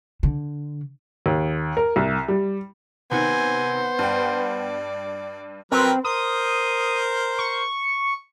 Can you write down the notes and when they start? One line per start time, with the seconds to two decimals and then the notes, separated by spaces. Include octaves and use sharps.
0.23 D3
1.26 D#2
1.77 A#4
1.96 C2
2.28 G3
3.11 C3 D#3 B3 C5 G#5
3.99 G2 D5 G5
5.72 F#3 C4 A#4 B4
6.05 A#4 C5 D#6
7.39 C#6